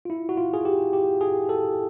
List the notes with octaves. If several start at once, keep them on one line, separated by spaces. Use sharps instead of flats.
F4
E4
F#4
F4
G#4
G4
G4
G#4
A4